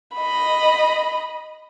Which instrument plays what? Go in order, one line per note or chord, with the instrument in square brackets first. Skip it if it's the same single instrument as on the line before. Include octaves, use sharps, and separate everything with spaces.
[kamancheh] D#5 B5